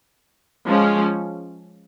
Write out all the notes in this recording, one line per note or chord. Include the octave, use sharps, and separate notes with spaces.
F3 G#3 C#4